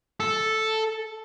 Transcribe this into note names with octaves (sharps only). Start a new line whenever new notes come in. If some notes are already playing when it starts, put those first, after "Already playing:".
A4